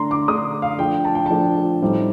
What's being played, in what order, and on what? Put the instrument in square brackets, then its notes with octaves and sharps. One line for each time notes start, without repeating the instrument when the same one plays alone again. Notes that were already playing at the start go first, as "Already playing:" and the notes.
Already playing: [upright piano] D3 A3 D4 A#5 C6
D6
D3 A3 D4 D#6
F5
F3 A3 D4 G5
A5
G5
F3 A3 D4 A5
A2 G3 C4 D#4